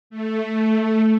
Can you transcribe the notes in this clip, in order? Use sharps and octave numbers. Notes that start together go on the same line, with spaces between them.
A3